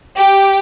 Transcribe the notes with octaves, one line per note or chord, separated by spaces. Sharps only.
G4